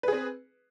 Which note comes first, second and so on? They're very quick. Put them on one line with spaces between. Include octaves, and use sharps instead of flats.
B4 G#4 C4